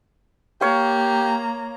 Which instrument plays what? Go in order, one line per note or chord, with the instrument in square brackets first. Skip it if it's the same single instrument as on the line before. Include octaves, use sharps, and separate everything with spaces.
[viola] A#3 A#5 [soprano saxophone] G4 [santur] C#5 F5